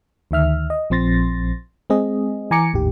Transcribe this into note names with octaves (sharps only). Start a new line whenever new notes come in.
D2 D#3 E5 F6
D#5
A#1 F3 C4 C6 A6 A#6
G#3 C4 G#4 D#5
E3 G#5 A#5 D6 C#7
G#1 D#2 A2 D#3 G4